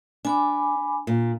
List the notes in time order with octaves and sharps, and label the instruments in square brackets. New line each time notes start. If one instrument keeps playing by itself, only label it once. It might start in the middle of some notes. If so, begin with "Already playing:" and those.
[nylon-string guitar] D4 [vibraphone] G#5 B5 D6
[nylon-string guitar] A#2